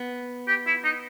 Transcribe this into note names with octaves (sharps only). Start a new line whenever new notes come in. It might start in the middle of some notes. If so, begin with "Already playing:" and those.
Already playing: B3
G4
E4
D#4